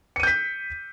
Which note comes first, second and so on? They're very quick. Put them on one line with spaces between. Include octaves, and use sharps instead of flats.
C#7 D#7 G6 B6